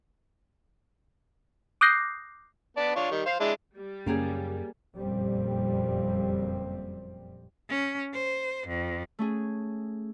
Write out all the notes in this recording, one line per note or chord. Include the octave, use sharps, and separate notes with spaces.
D6 D#6 F#6 G6 A#6 C7
B3 D5 A5
D4 F4 C#5
D#3 G3
C5 F5
G#3 D4 E4
G3
F#2 C#3 A#3 C#4 G4 G#4
F#1 F2 A#2 G3 C4
C#4
C5
F2
A3 C#4 G#4